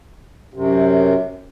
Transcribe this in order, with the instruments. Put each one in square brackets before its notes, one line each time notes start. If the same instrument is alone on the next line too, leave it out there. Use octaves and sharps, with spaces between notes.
[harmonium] F#2 C3